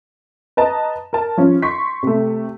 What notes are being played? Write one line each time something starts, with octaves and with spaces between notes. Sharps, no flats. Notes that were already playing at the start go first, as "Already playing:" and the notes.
B4 D#5 A5 A#5
A#4 A5
F3 C#4
C6 C#6 B6
C3 A3